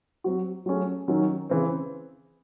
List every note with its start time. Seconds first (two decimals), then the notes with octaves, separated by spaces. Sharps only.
0.24 F#3 C4 F#4
0.66 F#3 A3 C#4 G#4
1.08 D#3 F#3 C#4
1.50 C#3 E3 C4